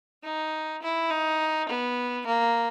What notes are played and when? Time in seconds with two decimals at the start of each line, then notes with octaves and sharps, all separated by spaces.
0.24 D#4
0.82 E4
1.10 D#4
1.69 B3
2.27 A#3